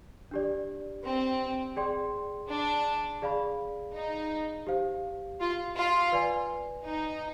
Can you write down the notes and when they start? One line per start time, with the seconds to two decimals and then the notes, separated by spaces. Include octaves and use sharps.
0.31 D4 G4 D5
1.04 C4
1.76 G#4 D5 G5 C6
2.49 D4
3.22 G#4 D5 F5 B5
3.95 D#4
4.67 G4 C5 F5
5.40 F4
5.76 F4
6.12 B4 D5 G#5
6.84 D#4